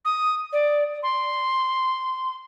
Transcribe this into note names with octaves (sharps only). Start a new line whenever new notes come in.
D#6
D5
C6